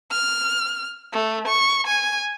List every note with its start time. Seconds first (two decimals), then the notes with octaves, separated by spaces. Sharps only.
0.11 F6
1.12 A3
1.48 C#6
1.87 G#5